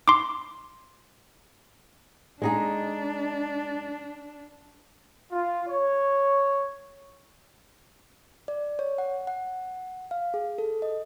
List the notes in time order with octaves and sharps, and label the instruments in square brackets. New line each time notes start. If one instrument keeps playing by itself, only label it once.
[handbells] C6 D6
[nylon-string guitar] G#3 D#4 G#4 [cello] D4
[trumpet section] F4
C#5
[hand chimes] D5
C#5
F#5
F#5
F5
G#4
A4
D#5